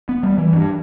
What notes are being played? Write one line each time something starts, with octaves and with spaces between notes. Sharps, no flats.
B3
G3
E3
G2